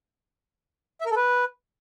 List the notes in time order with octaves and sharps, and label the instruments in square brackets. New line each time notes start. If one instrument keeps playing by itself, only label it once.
[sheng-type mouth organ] E5
A#4
A4
B4